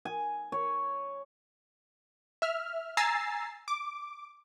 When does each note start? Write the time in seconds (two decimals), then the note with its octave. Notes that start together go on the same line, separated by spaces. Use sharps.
0.05 G#5
0.52 C#5
2.42 E5 F6
2.97 G#5 A#5 E6 A6 C7
3.68 D6